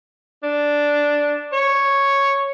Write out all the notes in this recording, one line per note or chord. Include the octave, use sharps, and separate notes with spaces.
D4
C#5